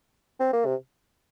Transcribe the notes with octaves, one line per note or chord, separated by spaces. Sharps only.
C4
A#3
C3